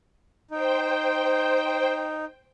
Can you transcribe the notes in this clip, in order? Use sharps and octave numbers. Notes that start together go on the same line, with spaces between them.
D#4 C5 G5